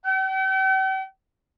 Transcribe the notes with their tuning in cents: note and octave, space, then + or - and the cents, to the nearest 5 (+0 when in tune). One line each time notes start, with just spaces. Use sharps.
G5 -45